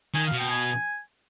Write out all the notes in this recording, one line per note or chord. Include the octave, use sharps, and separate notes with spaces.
D#3 G#5
F5
B2
G5
G#5